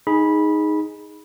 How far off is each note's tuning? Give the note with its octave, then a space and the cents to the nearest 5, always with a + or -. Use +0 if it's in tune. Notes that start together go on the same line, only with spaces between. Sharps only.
D#4 +5 G#4 +0 B5 -15